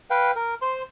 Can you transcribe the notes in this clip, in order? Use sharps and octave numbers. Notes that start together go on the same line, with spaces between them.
B4 F5 G5
A#4
C5 C6